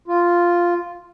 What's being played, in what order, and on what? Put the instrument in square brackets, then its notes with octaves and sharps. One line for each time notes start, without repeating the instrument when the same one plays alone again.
[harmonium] F4